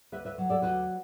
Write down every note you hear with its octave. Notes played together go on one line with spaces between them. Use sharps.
D2 B4 E5
B4 E5
F#3
A4 D5
D2 F#4 B4